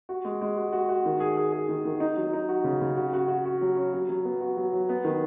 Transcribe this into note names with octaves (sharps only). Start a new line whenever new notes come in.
F#4
G#3
G#3
F#4
F#4
F#4
D#3
G#4
G#4
G#4
D#3
D#3
D#4
F#3
D#4
F#4
C#3
C#3
F#4
F#4
F#4
F#4
F#3
C#4
F#3
F#3
B3
F#4
F#3
F#3
B3
D#3